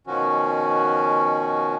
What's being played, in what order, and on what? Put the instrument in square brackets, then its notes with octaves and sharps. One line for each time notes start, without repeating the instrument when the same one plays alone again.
[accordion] B2 D#3 F3 C#4 F#4